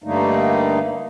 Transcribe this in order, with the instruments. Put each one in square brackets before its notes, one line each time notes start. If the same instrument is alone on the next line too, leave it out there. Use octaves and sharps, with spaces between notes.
[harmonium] G2 D3 G3 A3 A#3 D#4